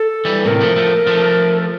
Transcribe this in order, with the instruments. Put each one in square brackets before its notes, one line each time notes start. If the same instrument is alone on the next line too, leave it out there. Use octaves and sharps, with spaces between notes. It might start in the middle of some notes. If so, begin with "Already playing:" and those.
Already playing: [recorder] A4
[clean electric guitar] E3 G3
[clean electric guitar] A2 C3 [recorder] A#4
[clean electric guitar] F3 A3
F3 A3
F3 A3